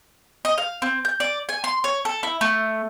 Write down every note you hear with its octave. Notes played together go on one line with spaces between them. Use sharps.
D#5
F5
C4
G6
D5
G#5
C6
C#5
A4
E4
A3